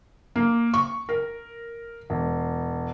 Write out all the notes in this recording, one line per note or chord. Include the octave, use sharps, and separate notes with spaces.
A#3
C#6
A#4
E1